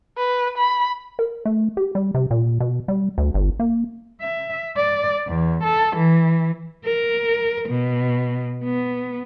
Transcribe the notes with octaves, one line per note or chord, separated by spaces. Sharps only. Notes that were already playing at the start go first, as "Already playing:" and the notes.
B4
B5
A#4
A3
G4
G3
C3
A#2
B2
G3
D2
G1
A#3
E5
D5
E2
A4
E3
A#4
B2
B3